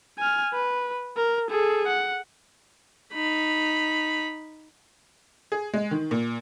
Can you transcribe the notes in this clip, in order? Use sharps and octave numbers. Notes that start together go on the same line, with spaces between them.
G#5 F6
B4
A#4
G#4 A4
F#5
D#4 B5
G#4
G#3
D#3
A#2